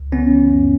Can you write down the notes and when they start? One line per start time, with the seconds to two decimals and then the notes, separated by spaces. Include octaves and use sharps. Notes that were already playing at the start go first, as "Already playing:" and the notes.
Already playing: C#2
0.12 C#3 B3 C#4
0.31 E3
0.49 F#2